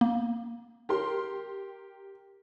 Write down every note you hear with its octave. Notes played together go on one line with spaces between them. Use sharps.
A#3
G4 A#4 C6